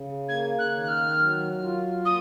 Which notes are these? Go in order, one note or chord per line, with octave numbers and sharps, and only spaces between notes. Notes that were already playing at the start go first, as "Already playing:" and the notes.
Already playing: C#3
A#3 G#6
F#6
D#3
F#6
F6
F#3
F4
A#3 D#6